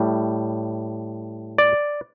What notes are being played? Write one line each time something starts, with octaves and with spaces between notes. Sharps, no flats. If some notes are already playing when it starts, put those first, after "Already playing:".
Already playing: A2 G3
D5